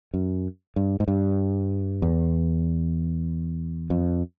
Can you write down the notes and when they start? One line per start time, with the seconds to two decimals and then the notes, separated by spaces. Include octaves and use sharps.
0.14 F#2
0.76 G2
1.00 G#2
1.08 G2
2.02 E2
3.90 F2